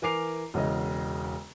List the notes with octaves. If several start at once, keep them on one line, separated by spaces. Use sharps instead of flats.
E3 A#4 G#5 D6 C7 F7
E1 E2 C#3 D#5